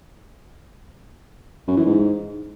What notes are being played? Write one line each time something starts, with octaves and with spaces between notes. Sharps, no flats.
F#2
E3
G#2